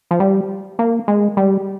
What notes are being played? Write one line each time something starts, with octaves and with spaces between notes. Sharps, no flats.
F3
G3
A#3
G#3
G3